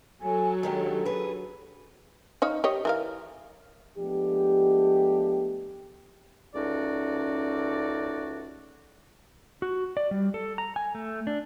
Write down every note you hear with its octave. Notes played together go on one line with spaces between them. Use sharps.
F#3 A4 G#5
D#3 G#3 D4 G4
G#4 B4
D#4 C#5 F5
G4 C#5 D#5
E3 A#4 F5
F3 G#3 A3 B3 D4 G4
C#2 A3 C#4 D#4 F#4 D5
F#4
D5
G3
A4
A#5
G#5
A3
D4